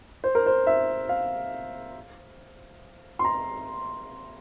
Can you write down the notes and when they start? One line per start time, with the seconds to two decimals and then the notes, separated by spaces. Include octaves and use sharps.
0.24 C5
0.35 A#4
0.46 C5
0.67 E5
1.09 F5
3.19 C6
3.25 A#5